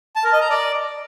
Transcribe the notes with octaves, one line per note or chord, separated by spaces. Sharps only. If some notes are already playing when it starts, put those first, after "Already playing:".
A5
A#4
D#5
A#5
D5